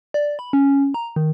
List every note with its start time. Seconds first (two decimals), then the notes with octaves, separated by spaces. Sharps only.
0.14 D5
0.39 B5
0.53 C#4
0.94 A#5
1.16 D#3